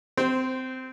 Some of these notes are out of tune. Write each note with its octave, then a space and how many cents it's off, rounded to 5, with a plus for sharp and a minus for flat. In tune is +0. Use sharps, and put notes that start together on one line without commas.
C4 -20 C5 +0